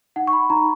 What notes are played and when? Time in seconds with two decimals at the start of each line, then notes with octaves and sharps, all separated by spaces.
0.16 D#4 F#5
0.27 C#6
0.33 B5
0.50 D#4 A#5